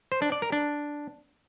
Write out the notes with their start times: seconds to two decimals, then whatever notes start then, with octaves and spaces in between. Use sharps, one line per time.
0.12 C5
0.22 D4
0.32 D5
0.42 A#4
0.52 D4